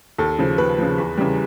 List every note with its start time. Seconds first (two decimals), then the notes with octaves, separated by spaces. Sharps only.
0.19 D#2 A4
0.39 C#3 F3
0.58 D#2 B4
0.78 C#3 F3
0.98 E2
1.17 C#3 E3 G3